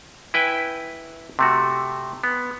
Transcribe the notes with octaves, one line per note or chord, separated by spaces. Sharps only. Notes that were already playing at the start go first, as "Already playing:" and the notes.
E4 B4 G5 G#5
C3 A3 F#4
B3